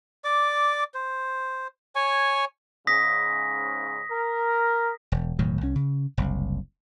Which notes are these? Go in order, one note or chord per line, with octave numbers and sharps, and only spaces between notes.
D5 D6
C5
C#5 G#5 C#6
G#2 C#3 D#6 A#6 B6
A#4
E1
E1 A2 D#3 F#3
C2 C#4
C#3
F#1 C2